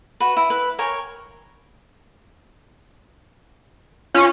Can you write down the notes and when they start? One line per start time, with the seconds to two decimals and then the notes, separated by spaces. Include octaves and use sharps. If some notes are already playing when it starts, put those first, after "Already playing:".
0.20 F#4 B4
0.37 E4
0.50 B4
0.79 A#4 C#5 G5 G#5
4.14 C#4 F4